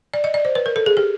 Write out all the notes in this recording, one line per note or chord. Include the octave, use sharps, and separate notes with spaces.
D5
D#5
D5
C5
B4
A#4
A4
G#4
G4